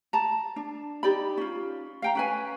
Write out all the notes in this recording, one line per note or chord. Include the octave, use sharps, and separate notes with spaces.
A5 A#5
D4
D#4 G4 D5 B5
C#4 F4
F5 G5 A#5
C#4 B4 G#5